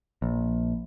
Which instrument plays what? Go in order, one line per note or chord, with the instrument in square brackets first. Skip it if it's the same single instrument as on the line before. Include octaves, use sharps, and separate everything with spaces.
[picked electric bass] A#1